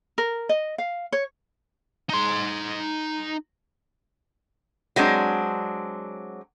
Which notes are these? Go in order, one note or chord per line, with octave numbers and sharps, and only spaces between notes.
A#4
D#5
F5
C#5
D#4 C6
F#3 G#3 C4 D4